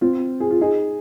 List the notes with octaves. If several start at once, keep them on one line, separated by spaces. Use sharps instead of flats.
C4 F4
G#4
F4
D#4 G#4